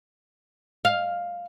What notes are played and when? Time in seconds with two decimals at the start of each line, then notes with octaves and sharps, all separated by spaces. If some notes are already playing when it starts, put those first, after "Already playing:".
0.85 F5